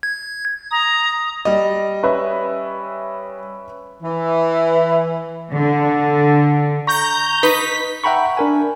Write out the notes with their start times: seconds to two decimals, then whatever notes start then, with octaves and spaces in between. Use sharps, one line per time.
0.03 G#6
0.71 A#5 D#6
1.45 G3 D#5
2.03 C#4 B4 E5
4.03 E3
5.54 D3
6.87 A#5 C#6 G6
7.43 D#4 B4 B6
8.04 E5 F#5 G5 A#5 B5 C#6
8.37 D4 A#4 G#5